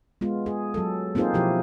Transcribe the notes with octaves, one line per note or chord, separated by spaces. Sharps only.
G#3 B3 F4
G#4
F#3 A4
A#3 C4 D#4 F4 G#4 C5
B2 F3 E4 G4